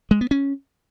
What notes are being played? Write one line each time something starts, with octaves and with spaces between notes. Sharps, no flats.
G#3
B3
C#4